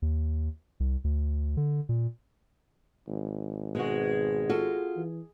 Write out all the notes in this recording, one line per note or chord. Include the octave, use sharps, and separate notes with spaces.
D#2
C2
D2
D3
A#2
G#1
B2 G#3 F#4
F4 F#4 A4
E3